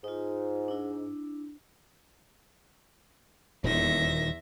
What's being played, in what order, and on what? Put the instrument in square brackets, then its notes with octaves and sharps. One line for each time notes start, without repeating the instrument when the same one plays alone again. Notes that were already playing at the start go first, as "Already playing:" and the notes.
[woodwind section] G#2 [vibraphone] D#4 F4
[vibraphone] D4 E4
[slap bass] D#1 A#2 D#3 [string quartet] E2 E5 A#6